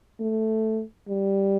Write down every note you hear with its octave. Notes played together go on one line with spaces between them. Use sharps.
A3
G3